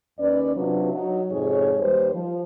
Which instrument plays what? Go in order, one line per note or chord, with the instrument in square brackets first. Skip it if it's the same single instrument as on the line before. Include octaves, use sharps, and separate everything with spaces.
[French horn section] D#2 C#4 B4 D5
C3 F#3 D4 F4 F#4 B4
F#3 D#4
F2 G#2 C3 G#4 C#5
D#2 G3 G4 B4 C5
F3